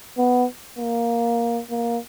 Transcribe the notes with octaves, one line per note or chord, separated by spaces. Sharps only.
B3
A#3
A#3